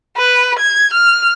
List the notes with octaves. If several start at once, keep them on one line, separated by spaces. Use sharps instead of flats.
B4
G#6
F6